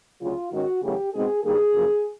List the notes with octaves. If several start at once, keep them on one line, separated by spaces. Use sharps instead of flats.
D2 C#3 F#3 F4
G#2 D#3 G#3 C#4 F#4
E2 C#3 F#3 A3 G4
B2 G#3 C4 D#4 G#4
G2 D#3 G3 A#3 G#4
F#2 C#3 F3 A#3